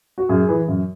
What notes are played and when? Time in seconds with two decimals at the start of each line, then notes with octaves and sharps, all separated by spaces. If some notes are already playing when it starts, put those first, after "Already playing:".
0.18 F#4
0.29 F#2 G#4
0.49 E3
0.68 F#2